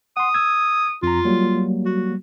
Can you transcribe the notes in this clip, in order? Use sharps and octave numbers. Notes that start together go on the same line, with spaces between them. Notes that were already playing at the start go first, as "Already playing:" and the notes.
F#5 C6 D#6
E6 G#6
F2 F4 A#5
F#3 G3 A#3
F#4